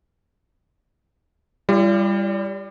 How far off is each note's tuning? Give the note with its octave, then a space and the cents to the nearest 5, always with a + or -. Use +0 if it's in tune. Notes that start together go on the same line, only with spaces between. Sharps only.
G3 +20 F4 -45 D5 -35